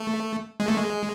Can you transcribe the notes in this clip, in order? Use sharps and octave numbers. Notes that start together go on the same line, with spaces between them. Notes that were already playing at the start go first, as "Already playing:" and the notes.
Already playing: A3
G#3
A3
G#3